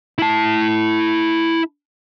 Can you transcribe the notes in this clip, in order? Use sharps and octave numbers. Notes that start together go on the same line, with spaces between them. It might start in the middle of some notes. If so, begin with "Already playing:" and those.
E4 A5